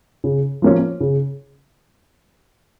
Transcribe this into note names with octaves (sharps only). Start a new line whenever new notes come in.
C#3
F3 A#3 C#4
C#3